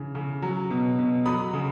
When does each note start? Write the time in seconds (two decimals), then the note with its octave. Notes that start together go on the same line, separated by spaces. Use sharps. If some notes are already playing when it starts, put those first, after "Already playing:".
Already playing: C#3 E3
0.15 C#3
0.42 F#3
0.71 B2
0.98 B2
1.26 F#3 B5 D#6
1.53 C#3